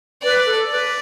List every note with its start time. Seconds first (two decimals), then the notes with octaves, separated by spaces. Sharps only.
0.23 B4 D5
0.46 A4
0.69 B4 D5